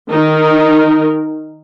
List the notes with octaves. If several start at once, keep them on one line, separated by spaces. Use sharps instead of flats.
D#3 D#4 A#4